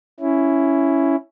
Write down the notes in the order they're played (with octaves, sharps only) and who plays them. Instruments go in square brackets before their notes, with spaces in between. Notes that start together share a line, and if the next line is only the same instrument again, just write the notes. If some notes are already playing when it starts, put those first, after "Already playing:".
[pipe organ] C#4 E4